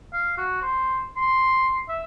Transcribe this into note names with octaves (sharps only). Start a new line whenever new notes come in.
F5
F#4
C5
C6
E5